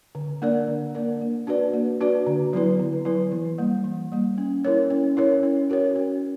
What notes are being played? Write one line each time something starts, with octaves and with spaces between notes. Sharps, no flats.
D3
A#3 D4 A#4 D5
D3
A#3 D4 A#4 D5
A#3
D4 F#4 B4 D5
A#3
D4 F#4 B4 D5
D3
F#3 B3 E4 B4
D3
F#3 B3 E4 B4
E3
G3 A#3
E3
G3 A#3
C#4
E4 A#4 C#5
C#4
E4 A#4 C#5
C#4
F#4 A#4 C#5
C#4